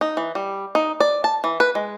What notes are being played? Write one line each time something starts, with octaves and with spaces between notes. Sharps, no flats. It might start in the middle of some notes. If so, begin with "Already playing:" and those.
D#4
E3
G3
D#4
D5
A5
E3
B4
G#3